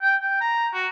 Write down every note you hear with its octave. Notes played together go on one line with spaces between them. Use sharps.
G5
G5
A#5
F#4